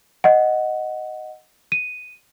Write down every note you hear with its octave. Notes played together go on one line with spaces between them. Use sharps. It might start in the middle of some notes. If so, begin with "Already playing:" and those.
D#5 F#5
D#7